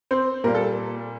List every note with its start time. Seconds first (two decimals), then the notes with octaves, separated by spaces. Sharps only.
0.11 C4 C5
0.44 A#2 G3 A#3 A#4
0.55 A4